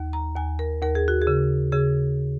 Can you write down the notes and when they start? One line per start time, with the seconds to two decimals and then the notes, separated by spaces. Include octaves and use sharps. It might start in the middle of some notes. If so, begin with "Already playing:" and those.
Already playing: D#2
0.13 A#5
0.36 D#2 G#5
0.59 A#4
0.82 D#2 A#4
0.95 G#4
1.08 F#4
1.22 G#4
1.27 C#3
1.72 C#3 G#4